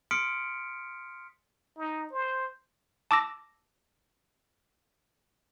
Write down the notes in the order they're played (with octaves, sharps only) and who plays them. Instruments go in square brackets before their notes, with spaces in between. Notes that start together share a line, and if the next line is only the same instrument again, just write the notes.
[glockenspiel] C6 D#6 F6 B6 C#7 D7
[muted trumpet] D#4
C5
[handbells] A5 D6 E6 A#6